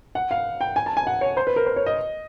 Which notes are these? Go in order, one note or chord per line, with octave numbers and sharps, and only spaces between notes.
F#5
F5
G5
G#5
A5
G#5
F#5
C#5
C5
B4
A#4
C5
C#5
D#5